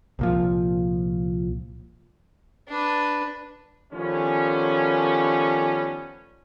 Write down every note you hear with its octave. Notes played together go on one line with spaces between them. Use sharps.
C2 A#2 F3
D4 B4
D#3 F3 G3 A3 B3 C#4